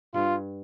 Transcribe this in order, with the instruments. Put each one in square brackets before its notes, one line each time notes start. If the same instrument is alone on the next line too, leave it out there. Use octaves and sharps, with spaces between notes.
[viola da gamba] G2 [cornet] F4